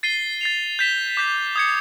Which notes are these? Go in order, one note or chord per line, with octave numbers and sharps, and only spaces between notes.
A6 C7 D#7 G7
A6 C7 F7
G6 B6 E7 G7
D6 G6 B6
D#6 G#6 C#7